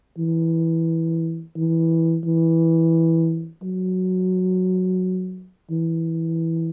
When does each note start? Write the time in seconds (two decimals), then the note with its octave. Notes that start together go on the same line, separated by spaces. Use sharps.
0.18 E3
1.56 E3
2.25 E3
3.63 F#3
5.71 E3